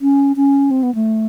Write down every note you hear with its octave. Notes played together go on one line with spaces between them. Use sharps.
C#4
C#4
C4
B3
A3